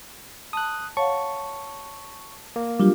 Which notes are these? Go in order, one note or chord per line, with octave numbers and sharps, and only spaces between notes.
A5 D#6 F#6
C#5 F5 F#5 A5 C#6
A#3
F#3 G3 D4 F4 G4